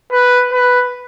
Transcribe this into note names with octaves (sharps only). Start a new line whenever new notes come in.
B4
B4